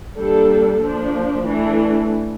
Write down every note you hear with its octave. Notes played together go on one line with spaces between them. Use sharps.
G3 A#3 D4 A4
F3 A#3 D4
E3 A3 D4